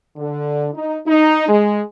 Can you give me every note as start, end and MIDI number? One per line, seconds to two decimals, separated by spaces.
0.17 0.68 50
0.74 0.97 63
1.07 1.47 63
1.49 1.83 56